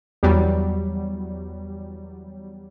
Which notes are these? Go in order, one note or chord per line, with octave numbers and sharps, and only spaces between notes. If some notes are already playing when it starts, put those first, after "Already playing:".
E2 F#3 G3